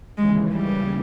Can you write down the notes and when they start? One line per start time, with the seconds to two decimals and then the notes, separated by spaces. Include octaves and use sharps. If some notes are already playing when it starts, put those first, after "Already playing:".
0.17 D#2 C#3 E3 G#3
0.53 G3